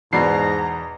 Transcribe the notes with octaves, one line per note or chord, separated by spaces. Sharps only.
E2 G#2 B2 D5 A#5 C7